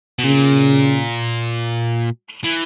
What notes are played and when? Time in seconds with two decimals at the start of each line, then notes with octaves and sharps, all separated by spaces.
0.19 B2
0.24 A#2 C#3
2.44 E3